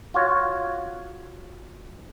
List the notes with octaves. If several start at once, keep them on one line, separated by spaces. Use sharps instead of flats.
F4 F#4 C#5